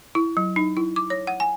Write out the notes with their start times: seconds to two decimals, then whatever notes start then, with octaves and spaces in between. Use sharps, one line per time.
0.15 E4
0.37 F#3
0.56 D#4
0.77 E4
0.96 D6
1.10 C#5
1.27 F#5
1.40 G#5